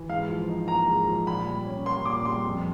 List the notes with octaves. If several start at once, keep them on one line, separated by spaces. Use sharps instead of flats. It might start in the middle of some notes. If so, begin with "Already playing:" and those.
Already playing: E3
G#2 F5
F3
D#4
A#3 A#5
G#2
F3
A#2 B5
G3
C#4
A#3 C6
A#2 D6
G3 C6
F2